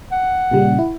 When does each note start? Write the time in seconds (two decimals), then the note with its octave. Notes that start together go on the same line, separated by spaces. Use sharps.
0.12 F#5
0.51 A#2 C#3 G3
0.79 E4